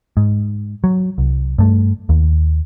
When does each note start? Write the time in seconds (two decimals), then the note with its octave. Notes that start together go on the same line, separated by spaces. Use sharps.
0.17 G#2
0.84 F#3
1.18 C2
1.58 G2 A3
2.09 D#2